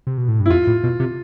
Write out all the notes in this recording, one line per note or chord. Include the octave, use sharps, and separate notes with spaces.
C3
B2
A2
G2
E4
F2 F4
A2
B2
C3